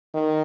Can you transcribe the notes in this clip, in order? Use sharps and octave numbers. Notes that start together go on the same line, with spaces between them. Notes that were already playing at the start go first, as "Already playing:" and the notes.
D#3